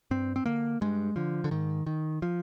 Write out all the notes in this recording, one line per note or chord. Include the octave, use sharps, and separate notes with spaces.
G2 C4
C4
D3 A#3
G2 G#3
D3 F3
D3
G#2 D#3
D#3
F3